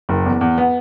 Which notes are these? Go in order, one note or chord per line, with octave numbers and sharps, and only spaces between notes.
F#1
E2
E2
B3